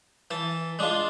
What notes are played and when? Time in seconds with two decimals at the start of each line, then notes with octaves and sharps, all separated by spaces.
0.31 E3 A5
0.79 G#3 D4 F4